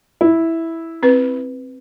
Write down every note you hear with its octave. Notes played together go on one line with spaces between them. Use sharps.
E4
C4 B4